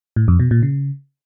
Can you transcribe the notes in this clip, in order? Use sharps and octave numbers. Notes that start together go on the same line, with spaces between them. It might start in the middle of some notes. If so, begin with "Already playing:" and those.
A2
F2
B2
A#2
C#3